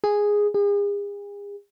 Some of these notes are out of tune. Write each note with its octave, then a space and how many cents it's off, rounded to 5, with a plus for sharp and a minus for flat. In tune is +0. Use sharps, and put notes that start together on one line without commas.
G#4 -5
G#4 -40